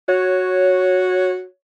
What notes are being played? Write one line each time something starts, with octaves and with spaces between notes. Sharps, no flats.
F#4 C#5